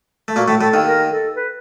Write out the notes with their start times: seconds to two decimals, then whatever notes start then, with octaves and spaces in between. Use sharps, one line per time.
0.28 A3
0.36 A#2 A#3 F#4
0.48 A2 A3
0.61 A2 A3 A4
0.73 D#2 D#3
0.86 A#4
1.11 A4
1.36 B4